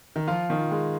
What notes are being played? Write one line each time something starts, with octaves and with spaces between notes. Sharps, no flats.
D#3
F3 F4
D#3
G#3